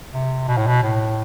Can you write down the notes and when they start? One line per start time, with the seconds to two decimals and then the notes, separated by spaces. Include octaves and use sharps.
0.14 C3
0.48 B2
0.57 A2
0.67 B2
0.82 A2